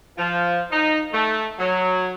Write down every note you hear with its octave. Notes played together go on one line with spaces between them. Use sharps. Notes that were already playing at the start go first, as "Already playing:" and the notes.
F3
D#4
A3
F#3